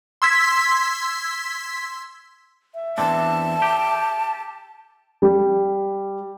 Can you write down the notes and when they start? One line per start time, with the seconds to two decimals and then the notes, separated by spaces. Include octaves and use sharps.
0.22 C6 E6 G#6 B6
2.75 E5
2.98 E2 C4 D4 A5
3.62 G4
5.22 G3